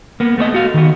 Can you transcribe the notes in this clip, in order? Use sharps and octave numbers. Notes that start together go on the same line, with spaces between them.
A#3 B3
A3 B3 C#5 D#5
A3 F#4 F5
D#3 B3